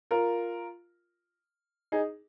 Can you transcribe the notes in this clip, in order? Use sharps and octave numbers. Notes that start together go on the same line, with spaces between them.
F4 A#4
D#4 G#4